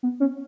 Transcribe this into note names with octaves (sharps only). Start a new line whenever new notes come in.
B3
C#4